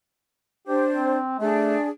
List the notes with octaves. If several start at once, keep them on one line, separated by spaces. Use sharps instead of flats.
D4 G4 C5
C4
A3 D4 G#4